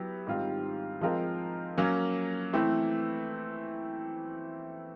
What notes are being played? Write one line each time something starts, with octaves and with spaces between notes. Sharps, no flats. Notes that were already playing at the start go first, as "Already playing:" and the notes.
Already playing: F#3 B3 E4 G4
G#2 D#3 G3 C4 F4
F3 G#3 C4 F4 A#4
F#3 A#3 C#4
E3 A3 C4 E4